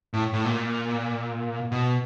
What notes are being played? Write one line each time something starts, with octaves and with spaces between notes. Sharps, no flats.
A2
A2
A#2
B2